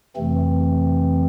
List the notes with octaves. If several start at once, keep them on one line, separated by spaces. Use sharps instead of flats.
F2 C3 E3 A3 C4